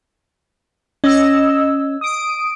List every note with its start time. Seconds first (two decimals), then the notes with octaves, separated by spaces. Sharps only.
1.04 C#4 D#5 E6
2.01 D#6 D7